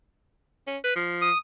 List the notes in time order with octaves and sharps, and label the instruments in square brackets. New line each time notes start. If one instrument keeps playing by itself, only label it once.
[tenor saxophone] C#4
B4
F3
[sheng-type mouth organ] D#6